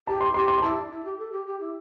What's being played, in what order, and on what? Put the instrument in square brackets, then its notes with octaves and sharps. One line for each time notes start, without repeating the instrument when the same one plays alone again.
[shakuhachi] G4 [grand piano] A5
[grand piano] C6
[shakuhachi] E4
[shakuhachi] G4 [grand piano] C6
[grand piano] C6
C6
[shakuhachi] E4 [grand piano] A5
[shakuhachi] D4
E4
G4
A4
G4
G4
E4